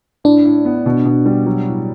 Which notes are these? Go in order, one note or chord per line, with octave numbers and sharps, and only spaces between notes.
A2 D4
A2
B3
B2
B2
G3
F#3
A2